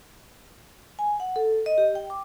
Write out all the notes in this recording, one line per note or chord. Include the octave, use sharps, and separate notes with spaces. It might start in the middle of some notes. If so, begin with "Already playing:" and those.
G#5
F#5
A4
D#5
G4
G5
D6